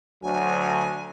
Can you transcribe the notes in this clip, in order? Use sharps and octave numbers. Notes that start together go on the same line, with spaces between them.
D2 F#3 G#5